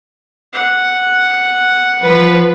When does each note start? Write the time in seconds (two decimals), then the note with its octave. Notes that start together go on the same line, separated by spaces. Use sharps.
0.54 F#5
2.02 F3 B4